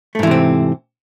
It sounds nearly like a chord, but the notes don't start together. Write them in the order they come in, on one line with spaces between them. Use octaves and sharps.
A3 G#2 E3 C3 C4